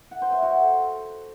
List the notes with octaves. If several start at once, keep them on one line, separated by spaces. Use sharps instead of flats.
F#5
C5
E5
F#4
A4